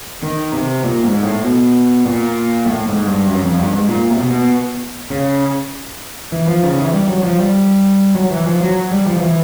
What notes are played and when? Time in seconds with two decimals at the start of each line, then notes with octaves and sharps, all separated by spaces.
0.23 D#3
0.53 C3
0.84 A#2
1.04 G#2
1.24 A2
1.44 B2
2.05 A#2
2.66 A2
2.86 G#2
3.07 G2
3.27 F#2
3.43 F2
3.58 G2
3.73 G#2
3.88 A#2
4.11 C3
4.19 B2
5.10 C#3
6.32 E3
6.48 F3
6.63 C#3
6.78 E3
6.93 G3
7.08 F#3
7.23 F3
7.39 G3
8.15 F#3
8.31 E3
8.46 F3
8.61 F#3
8.91 G3
9.07 F3
9.17 F3
9.22 E3